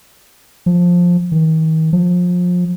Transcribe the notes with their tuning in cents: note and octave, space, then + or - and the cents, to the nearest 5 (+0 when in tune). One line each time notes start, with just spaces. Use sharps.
F3 +10
D#3 +40
F3 +30